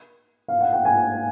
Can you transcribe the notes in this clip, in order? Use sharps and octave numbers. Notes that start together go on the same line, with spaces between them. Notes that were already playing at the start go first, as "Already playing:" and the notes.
F5
F#5
G5
G#5